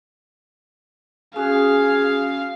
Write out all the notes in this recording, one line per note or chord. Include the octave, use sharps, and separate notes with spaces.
C#4 F#4 G#4 F5